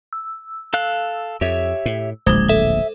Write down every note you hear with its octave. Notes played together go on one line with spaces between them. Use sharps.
E6
A4 F5 F#6
F2 G4 C#5 E5
A2
D1 A#1 G#3 C5
A4 E5